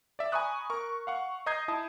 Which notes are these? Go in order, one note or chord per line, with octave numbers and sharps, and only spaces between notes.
D5 E5
G#5 A#5 B5 C#6 D#6 F#6
A#4 C#6
F5 F#5 C#6
D#5 A#5 D#6 G6 G#6 C7
E4 A5 D#6